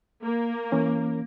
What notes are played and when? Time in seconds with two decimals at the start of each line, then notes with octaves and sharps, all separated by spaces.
0.23 A#3
0.72 E3 C#4